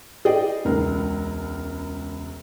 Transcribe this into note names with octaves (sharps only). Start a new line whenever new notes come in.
E4 G#4 D5 D#5 G5
E1 C#2 A#4